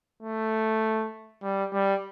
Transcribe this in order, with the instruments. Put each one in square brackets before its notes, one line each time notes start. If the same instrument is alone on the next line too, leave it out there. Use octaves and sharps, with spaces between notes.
[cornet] A3
G3
G3